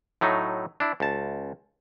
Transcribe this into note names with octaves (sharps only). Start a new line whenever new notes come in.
A2 F#3 A3 D#4
D4 E4
C#2 A5